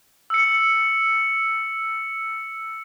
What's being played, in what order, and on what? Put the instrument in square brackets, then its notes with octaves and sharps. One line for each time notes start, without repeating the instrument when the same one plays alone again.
[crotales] E6 C#7